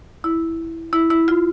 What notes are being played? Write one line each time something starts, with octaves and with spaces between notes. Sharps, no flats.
E4
E4
E4
F4